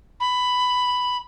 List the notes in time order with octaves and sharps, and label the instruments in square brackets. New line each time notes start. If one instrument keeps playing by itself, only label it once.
[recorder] B5